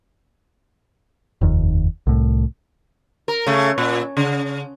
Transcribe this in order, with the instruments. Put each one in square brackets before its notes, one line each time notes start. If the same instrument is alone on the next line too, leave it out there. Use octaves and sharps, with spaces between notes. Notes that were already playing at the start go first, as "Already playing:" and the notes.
[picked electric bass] F1 D#2
C2 A2
[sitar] A#4
C#3 A3
A#2
C#3